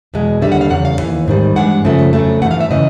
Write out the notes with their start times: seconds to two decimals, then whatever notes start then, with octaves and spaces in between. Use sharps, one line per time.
0.14 E2 B2 G#3
0.41 D#2 D3 G3 E5
0.52 F#5
0.61 F5
0.70 E2 C#3 F#5
0.85 F5
0.99 D#2 C#3 E3
1.28 G#2 D#3 G3
1.56 G2 E3 G#3 F#5
1.84 F#2 C#3 F3 A3
2.13 F2 C#3 F#3 A3
2.42 G2 E3 A3 F#5
2.51 F5
2.60 E5
2.71 C#3 E3 D#5